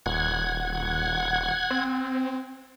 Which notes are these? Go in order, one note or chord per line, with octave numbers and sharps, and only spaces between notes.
D#1 F#5 G#6
C4